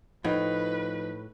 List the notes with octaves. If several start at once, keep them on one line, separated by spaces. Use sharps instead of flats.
A2 F3 D#4 B4